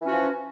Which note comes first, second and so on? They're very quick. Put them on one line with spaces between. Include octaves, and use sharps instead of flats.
E3 C#4 F#4 F3